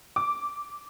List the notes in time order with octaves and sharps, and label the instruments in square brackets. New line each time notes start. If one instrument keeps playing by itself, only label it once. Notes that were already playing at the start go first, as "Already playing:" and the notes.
[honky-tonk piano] D6